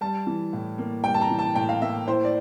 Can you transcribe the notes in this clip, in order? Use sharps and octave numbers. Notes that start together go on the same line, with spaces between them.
G3 A5
E3
A2
A#3
G3 G5
A5
A#5
E3
A5
A2 G5
F5
A#3 E5
E4 C5
D5